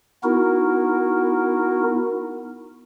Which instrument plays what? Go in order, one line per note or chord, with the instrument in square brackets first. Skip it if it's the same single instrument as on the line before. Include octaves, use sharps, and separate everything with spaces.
[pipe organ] B3 D#4 E4 F#4 A#4